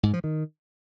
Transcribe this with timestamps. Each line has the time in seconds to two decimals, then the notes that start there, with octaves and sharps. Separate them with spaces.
0.03 G#2
0.13 F3
0.24 D#3